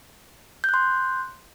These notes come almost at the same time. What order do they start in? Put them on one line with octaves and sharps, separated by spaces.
G6 F#6 C6